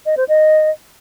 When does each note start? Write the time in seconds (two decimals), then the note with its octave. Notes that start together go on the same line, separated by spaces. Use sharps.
0.06 D#5
0.17 C5
0.28 D#5